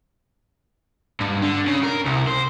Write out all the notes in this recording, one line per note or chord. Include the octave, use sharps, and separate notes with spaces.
G2
D3
C#3
A#4
C2
C5